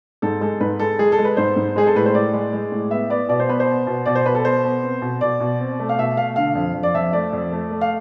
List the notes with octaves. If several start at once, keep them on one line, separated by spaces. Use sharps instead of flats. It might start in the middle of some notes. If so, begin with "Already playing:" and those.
G#2 A4
G#3 A4
G#2 B4
G#3 A4
G#3 G#4
A4
G#3
B4
G#2 C5
G#2
G#3 G#4
A4
A2 B4
C5
A2 D5
G#3
G#3
A2
B3 E5
B3 D5
B2 D5
C5
B3 B4
C5
B3
B2
B2 D5
C5
B2 B4
A4
B3 C5
B3
C4
B2
B2 D5
B2
C4
A3
F5
B2 E5
A3 F5
D3 F5
F2
F2
D5
F2 E5
A3 D5
F2
A3
A3
F5